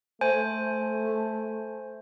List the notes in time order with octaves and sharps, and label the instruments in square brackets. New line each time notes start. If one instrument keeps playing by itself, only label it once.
[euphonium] A3 [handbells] C5 G#5